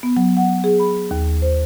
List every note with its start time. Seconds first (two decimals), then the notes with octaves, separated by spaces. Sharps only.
0.03 B3
0.17 F#3
0.37 F#5
0.64 G#4
0.80 B5
1.11 D#2
1.42 C5